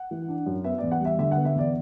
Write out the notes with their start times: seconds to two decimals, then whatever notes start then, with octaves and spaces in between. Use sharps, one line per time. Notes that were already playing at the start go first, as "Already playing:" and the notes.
Already playing: F#5
0.11 E3
0.28 D4
0.46 F#2
0.64 B3 E5
0.78 E2 D5
0.91 F#5
1.00 G3
1.05 E5
1.19 D3 E5
1.31 F#5
1.37 B3
1.45 E5
1.54 E2 D5